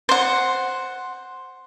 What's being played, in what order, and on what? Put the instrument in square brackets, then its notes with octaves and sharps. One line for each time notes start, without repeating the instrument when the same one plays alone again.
[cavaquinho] C5 F#5